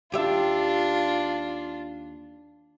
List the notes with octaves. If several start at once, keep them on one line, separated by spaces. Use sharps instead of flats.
D#2 D4 F4 G4 E5